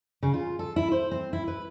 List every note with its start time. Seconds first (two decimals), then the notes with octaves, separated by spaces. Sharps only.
0.23 C#3
0.34 F4
0.59 A4
0.76 E4
0.92 C5
1.11 C4
1.33 E4
1.48 B4